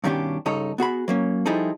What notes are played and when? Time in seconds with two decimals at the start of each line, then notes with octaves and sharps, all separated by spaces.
0.04 G2 B2 D#3 C#4 D4 G4
0.46 C#2 G2 D#4 A4 C#5
0.78 B3 F#4 G#4 B5
1.08 F#3 A#3 C#4
1.46 F3 G3 D#4 E4 G#4 A4